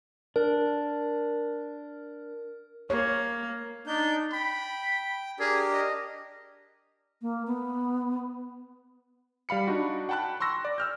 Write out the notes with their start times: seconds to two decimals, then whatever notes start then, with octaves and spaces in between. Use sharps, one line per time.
0.36 D4 A#4
2.90 A#3 C#5
3.87 D4 D#4 G6
4.33 G5 B5
5.40 D4 G4 G#4 A#4
5.73 D#5
7.22 A#3
7.47 B3
9.49 G3 F5 B5 C#7
9.67 D4 D#4 F#4
10.09 F#5 G5 A5 B5 F#6
10.40 C6 C#6 E6 A#6
10.65 D5
10.78 E6 F6 G6